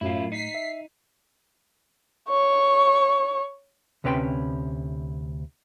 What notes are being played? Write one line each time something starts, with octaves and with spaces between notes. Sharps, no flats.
F#2 A2 A3 E4 F4
D#4 B6 C7
E5
C#5 C#6
D2 C3 C#4 B4 G5 C6